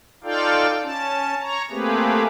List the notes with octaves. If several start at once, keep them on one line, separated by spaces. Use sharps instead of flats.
D#4 F4 A4 D5 F5 G5
C#4 A5
C#5 A#5
A3 A#3 C4 G4 G#4 B4